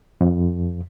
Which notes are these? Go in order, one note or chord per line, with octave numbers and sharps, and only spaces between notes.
F2